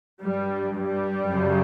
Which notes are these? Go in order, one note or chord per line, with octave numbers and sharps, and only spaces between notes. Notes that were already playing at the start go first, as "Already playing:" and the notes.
G2 G3
G3
F#2 C#3